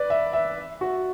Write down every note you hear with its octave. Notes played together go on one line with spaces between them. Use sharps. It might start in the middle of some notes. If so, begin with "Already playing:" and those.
Already playing: B4 D5
E5
E5
F#4